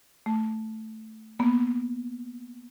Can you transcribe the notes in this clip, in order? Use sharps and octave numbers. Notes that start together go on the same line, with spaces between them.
A3
A#3 B3